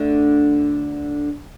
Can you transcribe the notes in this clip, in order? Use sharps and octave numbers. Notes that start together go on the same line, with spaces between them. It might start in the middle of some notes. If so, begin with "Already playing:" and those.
Already playing: D2 D3